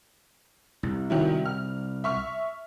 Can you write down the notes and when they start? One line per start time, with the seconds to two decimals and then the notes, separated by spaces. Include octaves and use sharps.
0.83 C2
1.10 D#3 F#3 E4
1.45 F6
2.04 E5 C#6 F6